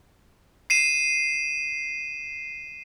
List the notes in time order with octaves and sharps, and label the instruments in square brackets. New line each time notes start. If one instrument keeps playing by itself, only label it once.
[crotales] C7 D#7 E7